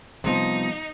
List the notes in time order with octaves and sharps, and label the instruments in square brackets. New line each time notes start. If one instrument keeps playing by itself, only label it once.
[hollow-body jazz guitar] C3 F3 [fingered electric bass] E3 G3 B3 [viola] D#4